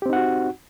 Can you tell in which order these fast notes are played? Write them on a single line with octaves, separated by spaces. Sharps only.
G4 C4 D#4 F#5 F#4